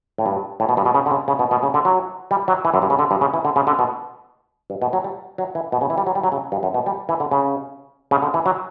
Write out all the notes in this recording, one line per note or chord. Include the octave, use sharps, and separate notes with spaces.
A2
G2
A2
B2
G2
B2
C#3
D3
C#3
C#3
B2
B2
C#3
D3
F#3
G3
F#3
E3
F#2
G2
C#3
D3
G2
C#3
E3
D3
C#3
D3
B2
G2
B2
F#3
G3
F#3
E3
B2
C#3
E3
G3
F#3
G3
F#3
C#3
G2
F#2
B2
G3
E3
D3
C#3
C#3
D3
E3
F#3